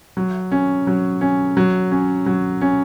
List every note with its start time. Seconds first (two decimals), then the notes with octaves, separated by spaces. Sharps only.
0.17 F#3
0.52 C#4
0.87 F#3
1.21 C#4
1.57 F#3
1.91 C#4
2.26 F#3
2.61 C#4